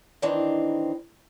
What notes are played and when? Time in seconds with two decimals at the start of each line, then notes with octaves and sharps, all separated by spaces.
0.22 D#3 E3 C4 D4 D#4